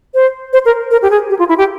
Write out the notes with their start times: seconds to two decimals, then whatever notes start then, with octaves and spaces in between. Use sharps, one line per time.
0.14 C5
0.53 C5
0.66 A#4
0.91 A#4
1.02 G4
1.10 G#4
1.29 G4
1.39 F4
1.49 E4
1.58 G4